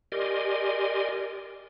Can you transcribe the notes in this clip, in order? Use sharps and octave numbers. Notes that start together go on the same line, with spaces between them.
G4 A#4 D5 D#5 G#5 C6